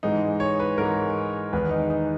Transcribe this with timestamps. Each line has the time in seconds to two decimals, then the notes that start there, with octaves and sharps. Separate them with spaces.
0.03 G#2 E3 G#3 D#4
0.40 C#5
0.60 B4
0.78 G#2 E3 G#3 A#4
1.53 E2 D#3 G#3 B4
1.71 D#4
1.90 D#4